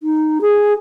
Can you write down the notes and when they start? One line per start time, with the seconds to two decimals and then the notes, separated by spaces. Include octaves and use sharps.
0.01 D#4
0.41 G#4